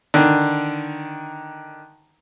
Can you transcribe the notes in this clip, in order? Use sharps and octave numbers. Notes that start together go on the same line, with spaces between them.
D3 D#3